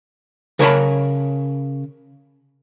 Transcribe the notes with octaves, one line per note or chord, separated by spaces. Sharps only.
C#3 A#4 C#5 A5 B5